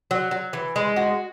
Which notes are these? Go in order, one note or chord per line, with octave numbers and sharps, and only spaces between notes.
F#3
F#3
E3
G#3
F#4